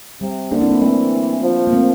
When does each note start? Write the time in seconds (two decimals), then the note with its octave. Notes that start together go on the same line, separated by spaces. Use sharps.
0.21 C3 G3
0.51 D3 A#3 D4
0.61 C4 E4
0.71 A#3 D4
0.81 E3 A3 C4
1.42 F3
1.67 A#3
1.73 A3 C4